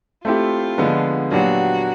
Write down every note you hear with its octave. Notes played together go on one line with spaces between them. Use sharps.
A3 C4 E4 F4 G4
D3 F3 G#3 B3 D4
A#2 F#3 B3 D4 F#4 G4